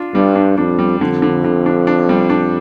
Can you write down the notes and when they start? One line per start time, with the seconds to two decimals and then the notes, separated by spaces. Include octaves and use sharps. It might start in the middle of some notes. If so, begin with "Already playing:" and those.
Already playing: D4 F4
0.14 G2 G3
0.35 D4
0.58 F2 D4
0.79 G3
1.00 F2 D3
1.22 D3
1.44 D3
1.66 D4
1.87 D4
2.09 G3
2.30 D4